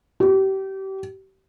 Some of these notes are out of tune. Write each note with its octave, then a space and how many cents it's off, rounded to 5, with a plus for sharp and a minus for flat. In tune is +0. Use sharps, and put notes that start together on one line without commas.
G4 -30